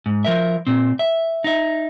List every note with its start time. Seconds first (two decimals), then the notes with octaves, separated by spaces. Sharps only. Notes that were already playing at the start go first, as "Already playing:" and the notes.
0.06 G#2
0.25 F3 A#4 E5
0.67 A#2 C4
0.99 E5
1.44 D#4 E5